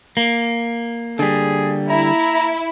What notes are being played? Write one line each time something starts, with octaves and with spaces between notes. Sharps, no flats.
A#3
D3 G3 G#4
E4 A#5